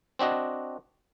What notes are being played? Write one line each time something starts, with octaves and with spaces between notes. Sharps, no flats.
C4 D4 F#4 D#5